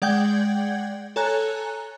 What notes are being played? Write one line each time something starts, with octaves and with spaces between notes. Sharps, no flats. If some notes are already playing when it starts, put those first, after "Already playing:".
G#3 D5 F#5 G5 G6 G#6
A4 C#5 G#5 A#5 F#6